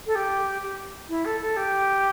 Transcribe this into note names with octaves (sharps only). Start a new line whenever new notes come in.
A4
G4
G4
E4
A4
A4
G4